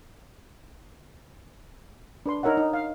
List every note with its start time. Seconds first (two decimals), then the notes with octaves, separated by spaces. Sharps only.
2.26 D4 B4 C6
2.43 D#4 A#4 C#5 E5 F#5
2.57 D#4
2.73 F5